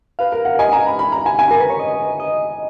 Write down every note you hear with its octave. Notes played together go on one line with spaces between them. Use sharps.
B4 F5
A#4
F#5
D#5 G#5
A#5
B5
B5
A#5
G#5
G#5
A#4
B4
C#5
D#5
D#5